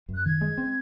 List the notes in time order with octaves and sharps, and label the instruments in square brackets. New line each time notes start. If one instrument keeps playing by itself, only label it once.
[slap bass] F#2
[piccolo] F#6
[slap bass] D#3 [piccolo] G#6
[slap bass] G#3
C4